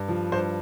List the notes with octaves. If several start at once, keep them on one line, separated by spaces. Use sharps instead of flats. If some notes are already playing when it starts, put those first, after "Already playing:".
Already playing: G2
F3
G2 C5